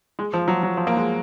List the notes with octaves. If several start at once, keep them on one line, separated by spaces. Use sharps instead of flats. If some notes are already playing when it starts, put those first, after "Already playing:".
G#3
F3
F#3
F#3
F3
A#3
G#3